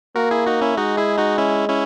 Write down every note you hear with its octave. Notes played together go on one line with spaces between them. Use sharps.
A#3 F#4 A#4
E4 G#4
D#4 F#4
C#4 E4
G#3 D#4 F#4
E4 G#4
D#4 F#4
C#4 E4
C#4 E4